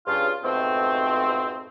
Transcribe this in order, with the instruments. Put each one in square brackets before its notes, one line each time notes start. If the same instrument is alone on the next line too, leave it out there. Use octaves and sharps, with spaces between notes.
[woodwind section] G2 C#3 F4
F2 G#2 B2 A3 C4